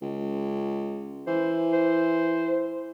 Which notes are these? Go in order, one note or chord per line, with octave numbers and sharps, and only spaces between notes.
C#2
E3 C5
C5